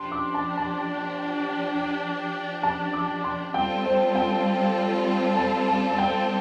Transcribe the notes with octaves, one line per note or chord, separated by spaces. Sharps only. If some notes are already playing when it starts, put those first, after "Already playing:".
Already playing: F3 D4 G4 C6
D6
A5
A5
A5
D6
C6
G3 C4 F4 A4 G5
C5
G5
A5
A5
A5
G5